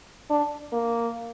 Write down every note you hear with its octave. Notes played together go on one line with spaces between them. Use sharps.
D4
A#3